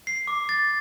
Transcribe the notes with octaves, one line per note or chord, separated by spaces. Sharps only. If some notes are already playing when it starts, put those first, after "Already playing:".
C7
D6
A6